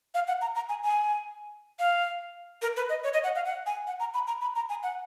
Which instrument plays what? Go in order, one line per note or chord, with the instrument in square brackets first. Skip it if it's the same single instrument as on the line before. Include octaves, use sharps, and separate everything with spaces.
[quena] F5
F#5
A#5
A#5
G#5
G#5
F5
A#4
B4
D#5
C#5
D#5
F#5
F5
F#5
G#5
F#5
A#5
B5
A#5
B5
A#5
G#5
F#5